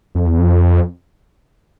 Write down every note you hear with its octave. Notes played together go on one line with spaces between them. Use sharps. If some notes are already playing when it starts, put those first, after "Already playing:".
F2
E2
F2